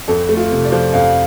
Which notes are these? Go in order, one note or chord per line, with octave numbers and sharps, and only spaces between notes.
F2 A4
A3
F4
C3
D5
F3
F2 F5